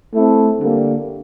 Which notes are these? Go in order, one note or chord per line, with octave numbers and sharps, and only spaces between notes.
A3 C4 E4 A4
D3 G3 A#3